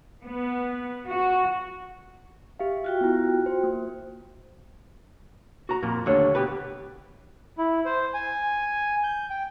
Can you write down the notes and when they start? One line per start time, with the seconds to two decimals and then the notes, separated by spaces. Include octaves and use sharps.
0.23 B3
1.05 F#4
2.59 G4 E5 F5
2.84 F4 F#4 G5
3.01 B3 E4
3.46 C5
3.64 A#3
5.69 F#4 A#5
5.83 F2 A#2
6.06 D#2 D3 A3 D4 C#5
6.35 B2 G4 B4
7.58 E4
7.85 C5
8.14 G#5
9.04 G6
9.30 G5